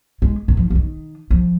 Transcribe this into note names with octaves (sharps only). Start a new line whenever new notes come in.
G#3
D#3
F3
F3
D#3
F3